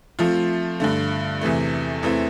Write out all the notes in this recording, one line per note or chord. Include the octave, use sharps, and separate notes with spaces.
F3 A3 C4 F4
G2 D3 A3
E2 C3 E3 A3
E2 E3 A3 C4 E4